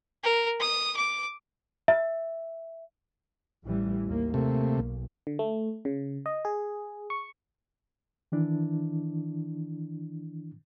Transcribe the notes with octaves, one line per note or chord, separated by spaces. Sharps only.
A#4
D#6
D6
E5
A1 E3 G3
D#2 A#3
C3 A3 A#3
B1
D3
A3
C#3
D#5
G#4
C#6
D#3 E3 D4 E4